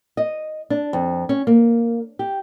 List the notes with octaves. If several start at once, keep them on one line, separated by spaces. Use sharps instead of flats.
D#5
D4
F2
C#4
A#3
G4